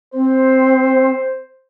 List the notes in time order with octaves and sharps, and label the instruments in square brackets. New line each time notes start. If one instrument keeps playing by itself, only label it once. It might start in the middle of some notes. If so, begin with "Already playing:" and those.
[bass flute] C4 [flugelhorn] C5